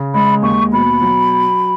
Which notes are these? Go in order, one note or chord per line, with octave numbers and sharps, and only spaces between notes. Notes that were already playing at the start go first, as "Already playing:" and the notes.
Already playing: C#3
G#3 B5
D#2 C#6
B2 B5
F#3